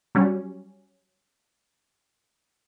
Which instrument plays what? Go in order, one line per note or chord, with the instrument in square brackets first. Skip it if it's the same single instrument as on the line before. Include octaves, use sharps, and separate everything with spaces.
[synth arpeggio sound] F#3 G3 C#4